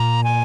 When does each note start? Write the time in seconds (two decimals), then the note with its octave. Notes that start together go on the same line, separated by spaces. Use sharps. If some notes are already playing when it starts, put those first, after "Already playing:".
Already playing: A#2 A#5
0.24 G#5